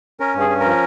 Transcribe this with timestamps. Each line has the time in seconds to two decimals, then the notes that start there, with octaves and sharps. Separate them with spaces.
0.20 C#4 A#4
0.35 G2
0.40 G#4
0.50 C#4
0.60 F3 A#4